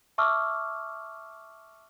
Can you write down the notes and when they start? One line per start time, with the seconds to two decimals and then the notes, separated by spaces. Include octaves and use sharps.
0.18 E5 A5 C#6 D6 E6 F6